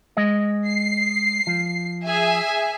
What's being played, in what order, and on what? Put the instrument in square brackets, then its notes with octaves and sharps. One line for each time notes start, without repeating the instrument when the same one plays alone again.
[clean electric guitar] G#3 D#5
[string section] C7
[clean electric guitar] F3
[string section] G#4 E5 G#5